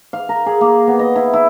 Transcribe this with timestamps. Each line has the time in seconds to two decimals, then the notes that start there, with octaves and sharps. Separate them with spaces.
0.13 F5
0.29 A#4
0.46 G#4
0.61 A#3
0.87 B3
0.99 D#5
1.16 E4
1.34 E4